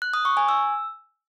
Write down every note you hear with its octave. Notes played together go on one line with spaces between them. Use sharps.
F#6
D#6
C#6
G#5
E6